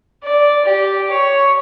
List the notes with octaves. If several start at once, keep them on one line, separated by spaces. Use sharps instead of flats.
D5
G4
C#5